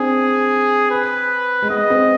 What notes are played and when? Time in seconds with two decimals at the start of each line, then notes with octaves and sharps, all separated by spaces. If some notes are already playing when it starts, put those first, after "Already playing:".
Already playing: C4 D4 G#4
0.91 B4
1.62 G#3
1.70 B3 D#5
1.90 C4